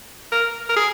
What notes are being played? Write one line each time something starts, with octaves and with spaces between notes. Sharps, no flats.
A#4
A#4
G#4